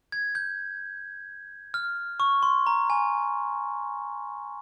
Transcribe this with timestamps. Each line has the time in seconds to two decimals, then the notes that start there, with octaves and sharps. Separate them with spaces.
0.12 G#6
0.35 G6
1.74 F6
2.20 C#6
2.43 C6
2.67 A#5
2.90 G#5